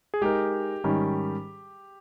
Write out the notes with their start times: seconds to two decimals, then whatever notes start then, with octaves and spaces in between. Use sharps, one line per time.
0.14 G#4
0.21 G#3 D#4 G4 A#4
0.84 G#2 D#3 G3 C#4